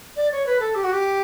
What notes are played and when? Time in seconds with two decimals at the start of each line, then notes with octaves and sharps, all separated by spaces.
0.16 D5
0.31 C#5
0.46 B4
0.60 A4
0.75 G4
0.83 F#4
0.92 G4